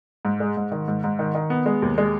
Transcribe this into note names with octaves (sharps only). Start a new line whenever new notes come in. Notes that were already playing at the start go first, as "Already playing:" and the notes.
G#2
G#3
G#2
D#3
G#2
G#2
D#3
D#3
B3
G#3
D#2
G#3